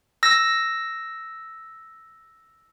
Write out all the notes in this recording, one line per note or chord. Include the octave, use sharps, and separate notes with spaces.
E6 A#6